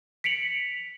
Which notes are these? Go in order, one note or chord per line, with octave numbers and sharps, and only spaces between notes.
B6 C#7 D7 F7 F#7